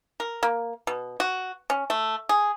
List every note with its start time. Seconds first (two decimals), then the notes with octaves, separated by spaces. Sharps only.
0.20 A#4
0.43 A#3
0.87 B2
1.20 F#4
1.70 C#4
1.90 A3
2.29 G#4